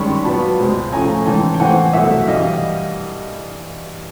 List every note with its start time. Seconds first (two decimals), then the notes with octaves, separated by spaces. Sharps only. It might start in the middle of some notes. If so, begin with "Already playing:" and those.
Already playing: G2 D#3 G#3 C#4 B5 C#6
0.24 A#2 F#3 B3 A5 B5
0.58 C#2 B2 G#3 C4
0.92 A2 F3 A3 C#4 G#5 A#5
1.26 G#2 E3 G#3 C#4 G5 A5
1.54 G5
1.60 A2 E3 A3 C4 F#5 G#5
1.93 C2 B2 F#3 A3 E5 F#5
2.28 G2 E3 G3 D#5 F5